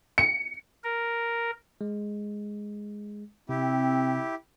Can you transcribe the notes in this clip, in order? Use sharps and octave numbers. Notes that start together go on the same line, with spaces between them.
C#7
A#4
G#3
C3 C4 E4 G4